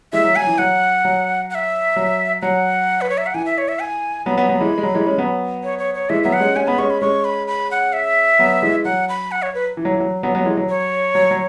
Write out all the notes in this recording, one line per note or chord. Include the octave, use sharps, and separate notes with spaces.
E3 G#3 E5
F#3
F#3 G#5
E3
F#3 F#5
F#3
F#5
E5
F#3
F#3 F#5
B4
C#5
E5
F#5
E3 G#5
E5
C#5
E5
G#5
F#3 B3 B5
F#3 B3
F#3 B3
E3 G#3
G#3
F#3
E3 G#3
G#3 C#4
F#3 B3
C#5
C#5
C#5
E3 G#3 E5
F#3 B3 E5
F#5
G#3 C#4
G#3 C#4 G#5
B3 B5
G#3 C#4 C#6
B5
G#3 C#4 C#6
B5
B5
F#5
E5
F#3 B3
E3 G#3
F#3 F#5
B5
F#5
C#5
B4
E3
F#3
E3
F#3
F#3 B3
F#3 B3
E3 G#3
F#3
C#5
F#3
F#3